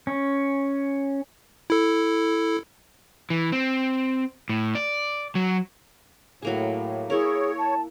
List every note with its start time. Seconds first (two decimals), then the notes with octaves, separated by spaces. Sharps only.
0.07 C#4
1.70 E4 A4
3.30 E3
3.52 C4
4.49 A2
4.75 D5
5.35 F#3
6.42 A2 F#3 A#3 G#4
7.10 E4 G#4 A#4 C#5
7.57 A5